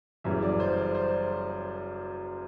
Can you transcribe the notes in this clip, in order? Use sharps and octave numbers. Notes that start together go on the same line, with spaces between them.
F#1 F#2 E3 G3 E5
D5
C5
D5
C5